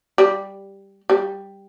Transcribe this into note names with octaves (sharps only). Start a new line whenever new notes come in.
G3
G3